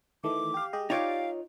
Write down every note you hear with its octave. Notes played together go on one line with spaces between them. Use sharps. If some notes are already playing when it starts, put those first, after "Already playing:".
D#3 E3 A3 D6
G4 F5
G#3 G4 D#5
D#4 F4 G4 C#5 D5 F5 D6